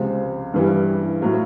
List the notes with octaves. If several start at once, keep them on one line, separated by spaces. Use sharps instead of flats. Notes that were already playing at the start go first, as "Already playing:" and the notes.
Already playing: C#2 C3 F3 G#3
G2 E3 G3
A2 F#3 A#3